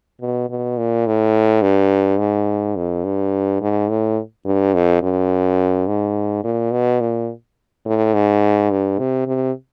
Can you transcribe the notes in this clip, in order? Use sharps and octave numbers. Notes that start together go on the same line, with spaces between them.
B2
B2
A#2
A2
G2
G#2
F2
G2
G#2
A2
G2
F2
F#2
G#2
A#2
B2
A#2
A2
G#2
G2
C3
C3